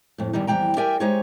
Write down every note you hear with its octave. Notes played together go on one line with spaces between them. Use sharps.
F2 A2
E2 G2 D#3 E3 G3 D#4
F2 E3 G3 G#3 G5 A#5
G4 A#4 D5 E5 G5 G#5
G#3 D#4 G4 C5 C#5 G#5